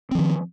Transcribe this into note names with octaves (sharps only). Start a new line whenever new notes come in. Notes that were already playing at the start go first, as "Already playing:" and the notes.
D#3 F3 C4